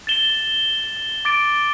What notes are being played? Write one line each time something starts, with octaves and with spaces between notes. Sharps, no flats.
A6 E7 G7
D6 A6 D7